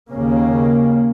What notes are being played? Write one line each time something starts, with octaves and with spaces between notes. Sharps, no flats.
D#2 C#3 A#3